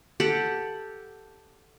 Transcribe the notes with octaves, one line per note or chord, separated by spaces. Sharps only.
G4 A4 F#5